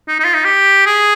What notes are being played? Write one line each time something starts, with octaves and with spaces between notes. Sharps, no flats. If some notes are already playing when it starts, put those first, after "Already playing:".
D#4
D#4
F4
D#4
G4
G#4